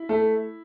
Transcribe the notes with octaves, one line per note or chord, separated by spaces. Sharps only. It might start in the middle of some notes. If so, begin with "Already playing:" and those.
Already playing: E4
A3